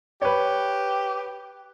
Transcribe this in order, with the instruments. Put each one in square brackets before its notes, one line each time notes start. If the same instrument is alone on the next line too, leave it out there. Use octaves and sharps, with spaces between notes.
[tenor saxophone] G4 [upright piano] B4 C#5